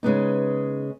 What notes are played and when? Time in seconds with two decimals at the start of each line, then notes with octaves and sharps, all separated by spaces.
0.03 C#3 G#3 B3 D#4